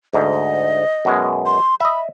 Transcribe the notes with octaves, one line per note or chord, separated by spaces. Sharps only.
D2 G#2 D#5
F#2 B2 G#3
C6
D#5 E5 B5